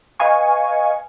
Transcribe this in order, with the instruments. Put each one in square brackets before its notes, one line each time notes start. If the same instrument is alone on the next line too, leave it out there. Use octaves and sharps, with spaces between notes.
[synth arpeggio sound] B4 D#5 F5 G#5 C#6